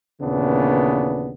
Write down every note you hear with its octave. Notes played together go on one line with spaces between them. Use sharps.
D#2 A#2 C#3 E3 B3 D4